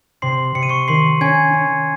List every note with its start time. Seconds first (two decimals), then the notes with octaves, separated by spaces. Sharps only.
0.22 C3 C6 C7
0.55 C3 C#7
0.63 D#7
0.69 C#6 C#7
0.88 D#3 C6 C7
1.21 C#4 G#5 G#6
1.54 C#4